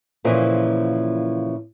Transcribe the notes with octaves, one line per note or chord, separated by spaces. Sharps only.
A#2 C#3 E3 F3 A#3